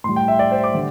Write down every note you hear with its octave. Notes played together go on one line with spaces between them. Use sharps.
A2 G3 C6
G5
E5
D5
C5
D6
D3 G3